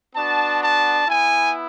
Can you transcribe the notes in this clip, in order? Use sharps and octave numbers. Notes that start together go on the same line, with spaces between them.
B3 D4 F#4 A5
A5
B3 E4 G#5